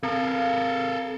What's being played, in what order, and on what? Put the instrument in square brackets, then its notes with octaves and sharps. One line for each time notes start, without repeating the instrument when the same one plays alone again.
[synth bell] C4 [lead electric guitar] A4 A#4 [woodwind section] F5